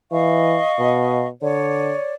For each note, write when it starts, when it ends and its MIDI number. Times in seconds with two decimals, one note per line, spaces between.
0.12 0.59 52
0.12 1.27 75
0.12 1.27 77
0.12 1.27 85
0.79 1.30 47
1.42 1.95 50
1.42 2.13 73
1.42 2.13 74